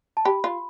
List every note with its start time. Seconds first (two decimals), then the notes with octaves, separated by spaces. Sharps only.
0.17 A5
0.25 G4 B5
0.44 F4